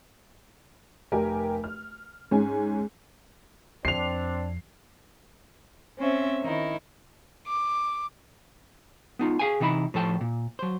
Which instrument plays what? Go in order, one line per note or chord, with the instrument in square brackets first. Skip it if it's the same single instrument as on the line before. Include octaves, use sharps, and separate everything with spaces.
[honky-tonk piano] F1 G4 A#4 G#5
F6
G#2 C#4 G#5
[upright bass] F2 [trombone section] C4 D4 [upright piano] C7 F7
[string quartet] C4 C#4 C5 E5
D#3 D#4 E4
D6
[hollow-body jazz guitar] B3 D#4 F4
G#4 F5 G5 G#5
C3 E3 D#4 E4 B5
A2 F3 A4 G5
A#2
F#3 C5